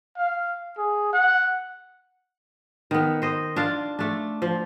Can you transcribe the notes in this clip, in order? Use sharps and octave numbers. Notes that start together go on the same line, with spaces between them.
F5
G#4
F#5
D#3 B3
C5 D#5
D4 F4 D5 F5
A3 D4
F3